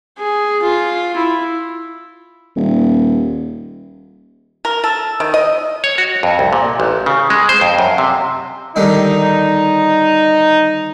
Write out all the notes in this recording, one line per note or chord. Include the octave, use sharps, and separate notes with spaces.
G#4
F4
E4
D#1
A#4
A4
D#3
D#5
C#5
F#4
F2
C2
A#2
A1
C#3
G#3
C5
F2
F#2
C3
D3 D#3 G3 D#4